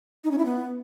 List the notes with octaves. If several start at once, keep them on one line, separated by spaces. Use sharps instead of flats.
D#4
C#4
E4
B3